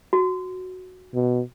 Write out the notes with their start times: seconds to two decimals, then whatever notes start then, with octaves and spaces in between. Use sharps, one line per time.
0.13 F#4
1.14 B2